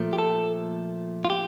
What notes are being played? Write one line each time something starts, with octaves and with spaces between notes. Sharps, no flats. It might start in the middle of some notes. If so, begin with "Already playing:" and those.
Already playing: A#2 F3 A3
G4
A4
F4
G4